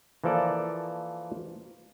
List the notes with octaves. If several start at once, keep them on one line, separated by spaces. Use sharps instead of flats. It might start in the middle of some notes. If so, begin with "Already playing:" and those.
E3 F3 A#3 A4 D5